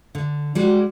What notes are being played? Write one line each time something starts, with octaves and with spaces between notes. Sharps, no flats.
D3
G3 G#3 F#4